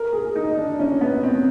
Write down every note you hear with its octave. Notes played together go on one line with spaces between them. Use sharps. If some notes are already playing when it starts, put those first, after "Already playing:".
Already playing: A#4
G#4
D#4
D4
C#4
B3
C4